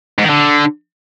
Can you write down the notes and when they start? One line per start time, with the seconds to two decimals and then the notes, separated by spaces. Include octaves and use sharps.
0.18 G#2
0.24 D#3
0.29 D3